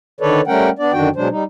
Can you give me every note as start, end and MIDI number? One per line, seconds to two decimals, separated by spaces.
0.21 0.41 50
0.21 0.41 51
0.21 0.41 69
0.21 0.41 71
0.21 0.41 73
0.21 0.41 74
0.47 0.70 55
0.47 0.70 57
0.47 0.70 61
0.47 0.70 70
0.47 0.70 78
0.47 0.70 79
0.79 0.93 59
0.79 0.93 62
0.79 0.93 74
0.93 1.09 42
0.93 1.09 50
0.93 1.09 51
0.93 1.09 62
0.93 1.09 66
0.93 1.09 79
1.16 1.28 47
1.16 1.28 54
1.16 1.28 56
1.16 1.28 62
1.16 1.28 72
1.30 1.44 55
1.30 1.44 63